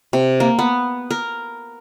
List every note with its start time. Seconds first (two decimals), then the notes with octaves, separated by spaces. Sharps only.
0.13 C3
0.40 A#3
0.59 B3
1.10 A#4